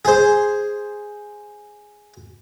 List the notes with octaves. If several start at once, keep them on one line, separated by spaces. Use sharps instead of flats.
G#4 C5